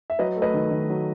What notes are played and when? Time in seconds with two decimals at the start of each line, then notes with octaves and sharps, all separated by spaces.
0.10 E5
0.19 F#3 B4 D#5
0.36 A3
0.42 B4 D#5
0.54 D#3
0.71 D#3
0.89 F#3